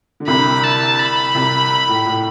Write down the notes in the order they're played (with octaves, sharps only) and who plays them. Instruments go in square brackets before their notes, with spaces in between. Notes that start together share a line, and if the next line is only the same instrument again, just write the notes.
[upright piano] D3
[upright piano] C2 C3 [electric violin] B5
[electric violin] A5
B5
[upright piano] C2 C3
A2
A2